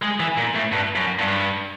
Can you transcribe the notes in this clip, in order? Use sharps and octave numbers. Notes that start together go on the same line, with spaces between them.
G#3
E3
A#2
A2
G2
F#2
G2